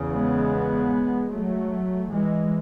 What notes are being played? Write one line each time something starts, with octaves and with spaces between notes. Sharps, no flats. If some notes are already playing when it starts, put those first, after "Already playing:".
Already playing: E2 C#3
G#3 B3
F#3 A3
E3 G#3